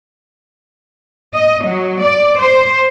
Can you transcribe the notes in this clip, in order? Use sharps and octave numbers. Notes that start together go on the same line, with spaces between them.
D#5
F#3
D5
C5